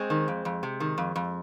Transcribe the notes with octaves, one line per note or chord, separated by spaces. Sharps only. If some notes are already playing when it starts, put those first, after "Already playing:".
Already playing: G#3 C4
D#3
F2
F2
C3
D#3
F2
F2